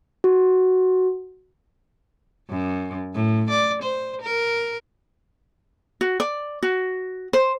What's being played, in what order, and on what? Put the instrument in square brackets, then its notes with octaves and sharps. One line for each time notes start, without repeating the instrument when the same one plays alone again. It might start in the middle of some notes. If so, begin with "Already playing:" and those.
[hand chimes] F#4
[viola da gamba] F#2
A2
D5
C5
A#4
[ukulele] F#4
D5
F#4
C5